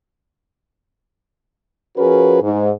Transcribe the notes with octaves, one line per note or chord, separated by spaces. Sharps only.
F3 C#4 F#4 G#4 A#4 B4
G#2